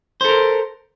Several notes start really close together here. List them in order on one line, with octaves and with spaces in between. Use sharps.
C5 A4 A#4